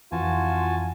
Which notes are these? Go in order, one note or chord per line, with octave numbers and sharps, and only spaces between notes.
F2 E3 F4 F#4 G#5 A5